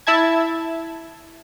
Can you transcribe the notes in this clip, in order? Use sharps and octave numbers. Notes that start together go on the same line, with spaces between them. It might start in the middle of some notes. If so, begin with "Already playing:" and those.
E4 E5 A5 G#6